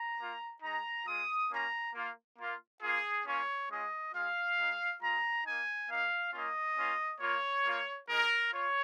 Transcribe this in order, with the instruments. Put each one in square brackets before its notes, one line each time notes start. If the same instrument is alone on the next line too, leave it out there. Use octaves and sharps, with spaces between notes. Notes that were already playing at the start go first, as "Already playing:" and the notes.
Already playing: [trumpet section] A#5
A#3 F4
G#3 D#4 A#5
G#3 F4 D#6
A#3 C#4 F4 A#5
A#3 F4
A#3 F4
A#3 F4 G#4
A#3 C#4 F4 C#5
G#3 C#4 F4 D#5
G#3 F4 F5
G#3 D#4
G#3 F4 A#5
A#3 D#4 G#5
A#3 D#4 F5
A#3 C#4 F4 D#5
A#3 C#4 F4
A#3 F4 C#5
A#3 F4
G#3 D#4 A#4
F4 C#5